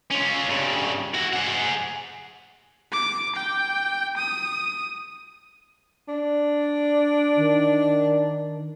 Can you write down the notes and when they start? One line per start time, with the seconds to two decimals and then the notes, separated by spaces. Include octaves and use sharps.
0.11 C#4 F4
0.49 G2 C#3
1.14 E4 F#4
1.33 G#4 F#5
2.92 D6
3.36 G5
4.17 D#6
6.08 D4
7.37 D#3